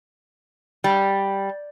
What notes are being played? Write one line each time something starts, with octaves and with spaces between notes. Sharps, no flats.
G3